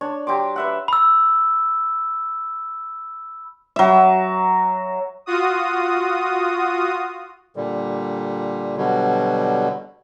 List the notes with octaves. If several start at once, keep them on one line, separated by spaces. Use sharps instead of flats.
D4 C#5
F#3 G4 C6 D6
B4 E5 F#5
B5 E6
F#3 E5
F4 F#4 D#6
A#2 D3 G3
B2 D3 F#3 G3